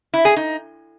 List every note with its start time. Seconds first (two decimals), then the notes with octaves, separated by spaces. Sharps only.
0.14 E4
0.25 G#4
0.36 D#4